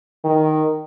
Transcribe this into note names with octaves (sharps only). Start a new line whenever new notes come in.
D#3